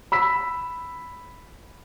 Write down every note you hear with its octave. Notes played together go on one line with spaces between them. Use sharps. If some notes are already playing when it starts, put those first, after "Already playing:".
B5 E6 B6